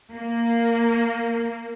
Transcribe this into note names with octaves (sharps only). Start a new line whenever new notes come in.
A#3